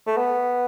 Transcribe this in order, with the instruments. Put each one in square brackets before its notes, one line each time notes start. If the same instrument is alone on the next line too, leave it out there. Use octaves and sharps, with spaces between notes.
[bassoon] A3
B3